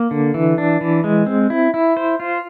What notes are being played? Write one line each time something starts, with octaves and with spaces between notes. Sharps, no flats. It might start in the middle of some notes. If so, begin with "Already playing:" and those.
Already playing: A#3
D3
E3
D4
E3
G#3
C4
E4
E4
C5
F4